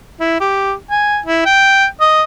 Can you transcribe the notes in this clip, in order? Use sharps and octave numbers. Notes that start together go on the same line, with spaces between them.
E4
G4
G#5
E4
G5
D#5